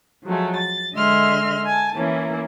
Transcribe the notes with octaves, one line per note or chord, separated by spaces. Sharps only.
F3 F#3 G#3 A3
A6
D3 G#3 D#5 E5 C6 F6
G#5 A5
E3 A#3 C#4 E4